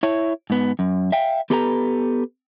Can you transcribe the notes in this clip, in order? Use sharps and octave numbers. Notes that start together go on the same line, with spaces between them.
E4 C#5
G#2 B3
F#2
E5 F5 G5
B3 G4 A4 B4 G5 A#5